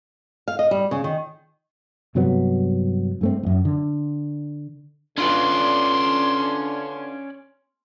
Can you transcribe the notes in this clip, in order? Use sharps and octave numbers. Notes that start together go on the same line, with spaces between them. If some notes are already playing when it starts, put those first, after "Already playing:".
F5
D#5
G3
C#3
D#3
G2 C3 F#3 B3
G2 A3 C4
D1 F#2
D3
D3 C#4 D4 F4 B4 D5 C6